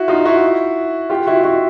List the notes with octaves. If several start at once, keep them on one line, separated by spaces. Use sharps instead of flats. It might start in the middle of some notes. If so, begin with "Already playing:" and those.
Already playing: E4 F#4
D#4 F4
E4 F#4
F4 G4
E4 F#4
E4 F#4